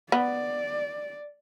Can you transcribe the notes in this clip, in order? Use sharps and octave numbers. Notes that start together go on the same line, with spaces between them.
B3 D5